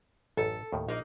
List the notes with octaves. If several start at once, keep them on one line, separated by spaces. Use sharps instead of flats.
A1 F#2 A4
D#2 A2 D#3
A#1 A#3 D#4 D5